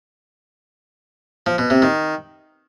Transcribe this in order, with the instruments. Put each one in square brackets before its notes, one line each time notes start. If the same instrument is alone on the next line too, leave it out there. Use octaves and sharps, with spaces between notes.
[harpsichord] F3
B2
C3
D#3